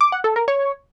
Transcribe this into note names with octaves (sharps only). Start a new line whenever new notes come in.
D6
F#5
A4
A#4
C#5